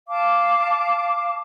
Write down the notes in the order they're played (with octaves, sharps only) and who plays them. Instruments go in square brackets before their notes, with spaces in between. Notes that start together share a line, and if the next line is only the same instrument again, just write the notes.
[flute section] F5 A5 D6